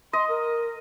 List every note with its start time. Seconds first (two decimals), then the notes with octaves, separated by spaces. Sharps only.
0.13 D#5 C6
0.29 A#4